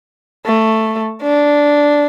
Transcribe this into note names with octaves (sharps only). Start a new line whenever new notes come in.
A3
D4